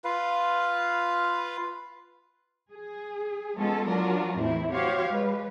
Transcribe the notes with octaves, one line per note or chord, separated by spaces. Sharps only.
F4 B4 F5
G#4
G#3 B3 C#4 F4 A4
F#3 D4 F4 F#4 A#4
E2 A2 C4 E4
F#4 G4 C5 C#5 F5
G#3 B4